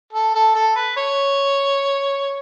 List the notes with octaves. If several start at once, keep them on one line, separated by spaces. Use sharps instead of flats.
A4
A4
A4
B4
C#5